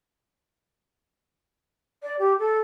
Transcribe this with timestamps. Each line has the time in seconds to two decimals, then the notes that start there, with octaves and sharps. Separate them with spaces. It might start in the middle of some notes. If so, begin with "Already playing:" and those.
2.03 D5
2.19 G4
2.39 A4